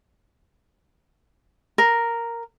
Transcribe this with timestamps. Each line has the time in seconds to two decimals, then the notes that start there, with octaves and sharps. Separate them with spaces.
1.78 A#4